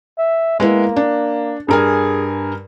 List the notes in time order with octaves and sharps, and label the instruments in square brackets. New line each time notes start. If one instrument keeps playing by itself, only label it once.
[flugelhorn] E5
[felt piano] G#3 B3 E4 [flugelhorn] A#3
[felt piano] D4
[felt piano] G2 A#4 G#5 [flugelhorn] G#4